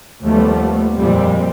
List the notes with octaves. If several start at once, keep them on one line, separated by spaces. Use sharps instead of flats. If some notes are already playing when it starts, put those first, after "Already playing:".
D#2 F3 G3 A3 B3
F2 A#2 G3 G#3 C4